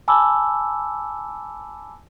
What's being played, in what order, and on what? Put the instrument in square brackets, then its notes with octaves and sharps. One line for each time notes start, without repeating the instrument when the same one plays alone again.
[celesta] G#5 A5 B5 D6 E6